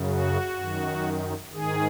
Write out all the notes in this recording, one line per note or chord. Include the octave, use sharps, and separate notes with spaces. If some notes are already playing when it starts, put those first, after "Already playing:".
Already playing: F#2 C#3
F#4
F#2 D#3
G#2 D#3 G#4